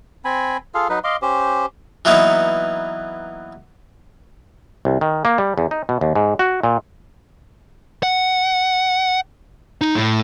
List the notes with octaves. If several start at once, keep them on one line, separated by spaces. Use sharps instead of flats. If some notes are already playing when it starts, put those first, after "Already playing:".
C4 G#5 B5
F4 G#4 A4 F5
F#3 D#4 B4
D#5 F5 C6 D6
C#4 G4 C5
E3 F#3 A#3 B3 D#4
C2
D#3
A#3
G3
E2
D#4
B2
D#2
G#2
F#4
A#2
F#5
D#4
A2